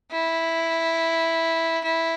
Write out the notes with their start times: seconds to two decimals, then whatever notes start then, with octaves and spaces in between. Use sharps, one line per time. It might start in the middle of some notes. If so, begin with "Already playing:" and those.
0.11 E4
1.84 E4